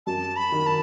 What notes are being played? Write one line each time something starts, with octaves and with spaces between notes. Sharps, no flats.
F#2 A5
B5
D#3
A5